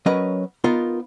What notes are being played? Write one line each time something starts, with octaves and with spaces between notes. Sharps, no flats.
F#3 C#4 A#4 B4 D#5
B3 D#4 F4 A#4